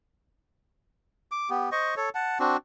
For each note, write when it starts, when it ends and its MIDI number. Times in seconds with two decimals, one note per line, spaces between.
1.32 1.50 86
1.50 1.70 59
1.50 1.70 67
1.72 1.95 72
1.72 1.95 75
1.72 1.95 85
1.97 2.09 69
1.97 2.09 73
2.15 2.38 78
2.15 2.38 81
2.40 2.57 60
2.40 2.57 62
2.40 2.57 66